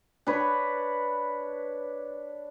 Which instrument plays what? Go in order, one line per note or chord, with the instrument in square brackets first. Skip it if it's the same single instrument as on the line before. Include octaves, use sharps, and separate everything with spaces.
[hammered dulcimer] D4 B4 C#5